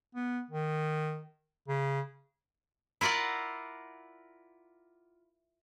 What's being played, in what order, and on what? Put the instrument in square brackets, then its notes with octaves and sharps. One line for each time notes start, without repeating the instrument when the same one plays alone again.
[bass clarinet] B3
D#3
C#3
[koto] E4 F4 A#4 D5 F#5